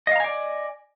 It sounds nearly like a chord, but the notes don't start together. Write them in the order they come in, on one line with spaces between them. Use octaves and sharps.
D#5 F5 A#5 G#5 D5